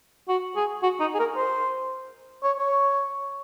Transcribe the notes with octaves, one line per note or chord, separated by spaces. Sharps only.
F#4
G#4
F#4
D#4
G#4
A#4
C5
C#5
C#5